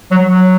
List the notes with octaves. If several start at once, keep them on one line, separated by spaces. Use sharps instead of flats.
F#3
F#3